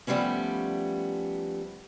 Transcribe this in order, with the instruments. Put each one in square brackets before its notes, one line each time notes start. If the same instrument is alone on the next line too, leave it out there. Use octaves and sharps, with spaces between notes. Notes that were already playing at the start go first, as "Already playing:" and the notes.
[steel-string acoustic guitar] F3 G3 A3 B3 C#4